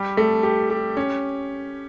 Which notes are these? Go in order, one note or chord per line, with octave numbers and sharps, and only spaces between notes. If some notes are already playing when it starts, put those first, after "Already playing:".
Already playing: G3 G4
A3
G4
G4
C#4